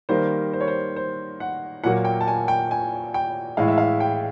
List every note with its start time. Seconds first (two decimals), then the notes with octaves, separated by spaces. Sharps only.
0.09 D#3 G3 A#3 C5
0.53 C5
0.61 C#5
0.68 C5
0.96 C5
1.40 F#5
1.84 A#2 F#3 A#3 F#5
2.05 G5
2.21 A5
2.28 G#5
2.48 G5
2.71 G#5
3.14 G5
3.57 A2 E3 G#3 F5
3.68 E5
3.78 F5
4.00 G5